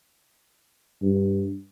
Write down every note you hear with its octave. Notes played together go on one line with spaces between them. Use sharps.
G2